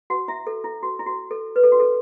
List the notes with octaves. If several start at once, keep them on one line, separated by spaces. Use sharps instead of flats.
F#4 F#5
E4 E5
A4
E4
F#4
E4
F#4
A4
B4
A4
F#4
A4